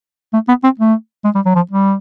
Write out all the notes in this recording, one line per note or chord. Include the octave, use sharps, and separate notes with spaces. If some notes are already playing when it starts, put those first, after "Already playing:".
A3
B3
C4
A3
G#3
G3
F#3
F3
G3